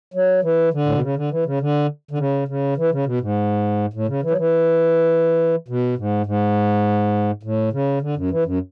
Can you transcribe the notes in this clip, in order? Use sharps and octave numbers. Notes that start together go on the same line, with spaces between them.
F#3
E3
D3
A2
B2
C#3
D3
E3
C#3
D3
D3
C#3
C#3
E3
C#3
B2
G#2
A2
C#3
E3
F#3
E3
B2
G#2
G#2
A2
C#3
D3
F#2
E3
F#2